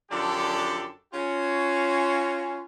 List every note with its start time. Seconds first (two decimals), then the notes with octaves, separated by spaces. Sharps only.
0.10 F#2 D3 F3 D4 G4 A4
1.13 C#4 F4 F#4